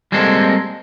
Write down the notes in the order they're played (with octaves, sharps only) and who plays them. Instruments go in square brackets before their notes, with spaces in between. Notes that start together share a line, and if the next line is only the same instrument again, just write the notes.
[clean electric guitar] G3 G#3 A#3 C4 A4